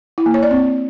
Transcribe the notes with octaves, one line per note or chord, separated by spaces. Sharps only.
E4
A#3
C#5
D5
C4